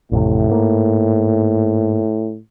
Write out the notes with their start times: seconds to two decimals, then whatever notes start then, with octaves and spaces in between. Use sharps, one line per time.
0.12 A1 F2 A2 C3
0.49 G#2 A#3